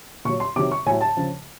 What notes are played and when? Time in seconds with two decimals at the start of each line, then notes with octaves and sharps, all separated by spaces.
0.25 A#2 C#6
0.29 F#3
0.40 C6
0.56 C3 D#3 F#3 D6
0.72 C#6
0.86 A2 G#5
0.90 F#3
1.01 A5
1.17 C#3 F3